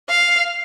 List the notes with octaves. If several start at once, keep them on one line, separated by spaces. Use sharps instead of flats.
F5